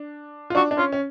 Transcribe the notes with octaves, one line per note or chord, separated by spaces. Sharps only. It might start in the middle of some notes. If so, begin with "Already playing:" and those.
Already playing: D4
F4
D4 F#4
D4
C#4 F4
C#4